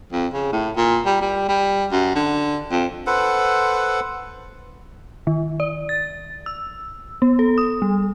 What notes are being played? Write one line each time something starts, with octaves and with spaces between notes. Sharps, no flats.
F2
C#3
A2
A#2
G3
G3
G3
F#2
D3
F2
A4 B4 C5 F#5
D#3
D5
A6
E6
B3
A4
D#6
G3